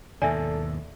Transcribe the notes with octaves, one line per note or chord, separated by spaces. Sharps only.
D#2 G#2 B2 A4 D5 E5 G#5